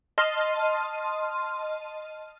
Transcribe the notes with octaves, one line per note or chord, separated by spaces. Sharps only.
D#5 A5 C6 F6